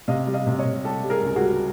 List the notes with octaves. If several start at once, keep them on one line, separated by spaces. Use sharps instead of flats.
C3 D#5 F5
G3
D#5 F5
C3
C#5 D#5
C3
G3 G4 A4
G3
G#4 A#4
C#2
F#4 G#4
G3